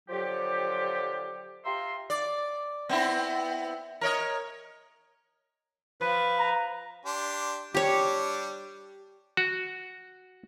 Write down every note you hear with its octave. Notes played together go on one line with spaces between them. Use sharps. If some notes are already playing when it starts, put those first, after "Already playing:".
D3 F3 F#3 F4 G4
F4 G4 E5 A#5 C6
D5
B3 C4 E4
A#4 C#5 D#5
F3 B4
A#5
D4 G4 C6
G3 D4 G4 C#5 D6
F#4